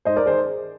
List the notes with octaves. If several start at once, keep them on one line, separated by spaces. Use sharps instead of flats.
G#2 C5 D#5
A#4 D5
D#3 G#4 C5